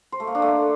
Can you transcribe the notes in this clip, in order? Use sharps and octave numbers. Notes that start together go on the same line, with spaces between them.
C5
A3
A#3
D4
A3